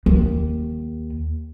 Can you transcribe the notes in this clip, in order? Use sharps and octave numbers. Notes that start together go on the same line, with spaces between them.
D#2